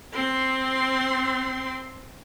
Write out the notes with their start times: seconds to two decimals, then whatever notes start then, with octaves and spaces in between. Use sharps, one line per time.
0.14 C4 C6